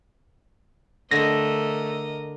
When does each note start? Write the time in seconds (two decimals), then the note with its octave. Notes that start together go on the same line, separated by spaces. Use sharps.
1.11 D3 A3 A#4 D#5 A#6